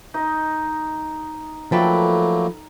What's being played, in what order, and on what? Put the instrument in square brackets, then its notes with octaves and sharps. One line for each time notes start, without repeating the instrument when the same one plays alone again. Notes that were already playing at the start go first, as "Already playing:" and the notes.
[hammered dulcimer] D#4 D#5
[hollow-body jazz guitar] F3 [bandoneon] F#3 A3 A#3 [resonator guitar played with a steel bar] A4 B4 G5